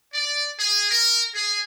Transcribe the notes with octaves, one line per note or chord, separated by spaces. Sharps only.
D5
G#4
A#4
G#4